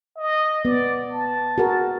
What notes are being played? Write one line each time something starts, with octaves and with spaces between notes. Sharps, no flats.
D#5
B3 D5
A5
F#4 G#4 A#4